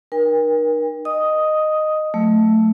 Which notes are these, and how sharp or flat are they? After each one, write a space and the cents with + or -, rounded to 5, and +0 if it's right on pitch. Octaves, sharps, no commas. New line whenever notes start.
D#4 -40 A#4 +35 G5 +45
D#5 -10 D#6 +5
F#3 -30 A3 +0 E6 +0